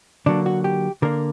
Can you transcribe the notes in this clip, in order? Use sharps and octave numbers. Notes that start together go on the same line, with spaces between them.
D3 F#3 A#3 D4
F#4
G4
D3 A#3 A#4